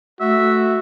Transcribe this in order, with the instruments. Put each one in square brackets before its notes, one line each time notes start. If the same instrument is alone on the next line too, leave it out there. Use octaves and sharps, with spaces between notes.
[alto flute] A3 [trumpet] F#4 [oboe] E5